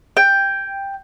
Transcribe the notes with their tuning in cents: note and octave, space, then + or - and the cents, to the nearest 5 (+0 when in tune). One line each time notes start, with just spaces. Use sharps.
G5 +10